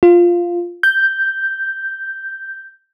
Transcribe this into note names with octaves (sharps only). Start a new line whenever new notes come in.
F4
G6